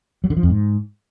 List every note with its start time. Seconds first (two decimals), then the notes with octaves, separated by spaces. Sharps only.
0.24 F#3
0.30 D3
0.37 F3
0.43 F2
0.50 G#2